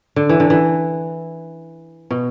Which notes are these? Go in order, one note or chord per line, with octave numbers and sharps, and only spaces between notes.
D3
E3
D3
E3
B2